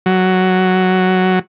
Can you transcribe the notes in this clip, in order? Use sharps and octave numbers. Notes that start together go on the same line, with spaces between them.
F#3